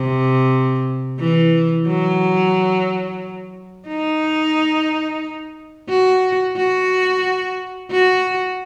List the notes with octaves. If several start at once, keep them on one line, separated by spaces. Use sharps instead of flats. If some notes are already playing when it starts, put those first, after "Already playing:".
Already playing: C3
E3
F#3
D#4
F#4
F#4
F#4